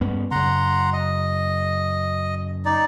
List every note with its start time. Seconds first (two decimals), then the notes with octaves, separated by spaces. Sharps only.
0.01 G2 B3 C#4
0.31 F#2 C#3 F#5 A#5 C6
0.93 D#5
2.65 D#4 D5